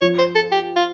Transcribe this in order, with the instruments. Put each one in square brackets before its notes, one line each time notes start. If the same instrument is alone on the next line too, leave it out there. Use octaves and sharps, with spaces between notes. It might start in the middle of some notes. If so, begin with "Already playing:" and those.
[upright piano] F3 [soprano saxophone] C#5
[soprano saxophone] C5
A4
G4
F4